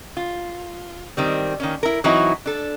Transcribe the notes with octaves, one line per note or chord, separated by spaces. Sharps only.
F4
D#3 G3 C4
D#3 A#3 C#4
E4 A#4
E3 F#3 C4 D#4 E4 F#4
D4 A4